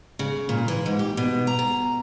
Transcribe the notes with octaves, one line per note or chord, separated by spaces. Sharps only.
C#3
A#2
E3
G#2
G4
B2
A#5
A#5